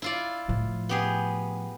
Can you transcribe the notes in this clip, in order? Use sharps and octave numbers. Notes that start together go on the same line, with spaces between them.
E4 F4 D5
A2 F3
B3 G4 G#4